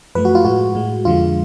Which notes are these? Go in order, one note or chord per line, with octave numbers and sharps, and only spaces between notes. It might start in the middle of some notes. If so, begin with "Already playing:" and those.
F#2 F3 A3 B4
F#4
F4
A2 G#3 F#4
A2 G#3
F2 D3 F3 G#3 F4